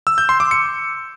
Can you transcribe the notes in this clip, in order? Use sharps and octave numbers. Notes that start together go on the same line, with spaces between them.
E6
G6
C6
D6
C#7